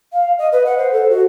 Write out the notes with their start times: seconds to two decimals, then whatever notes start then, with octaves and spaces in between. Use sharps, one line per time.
0.13 F5
0.38 D#5
0.52 B4
0.65 F#5
0.78 C5
0.93 A4
1.10 F#4